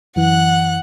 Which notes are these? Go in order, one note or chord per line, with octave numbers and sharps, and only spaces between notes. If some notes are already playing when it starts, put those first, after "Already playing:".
F#2 E3 F#5 F#6